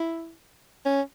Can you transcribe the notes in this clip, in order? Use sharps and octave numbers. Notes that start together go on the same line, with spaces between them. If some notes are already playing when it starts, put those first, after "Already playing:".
Already playing: E4
C#4